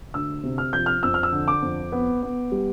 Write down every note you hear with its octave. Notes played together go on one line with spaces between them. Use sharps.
D2 E6
C3
F6
F3 G6
F6
F2 E6
F6
E6
D3
D6
F2
B3
B3
G3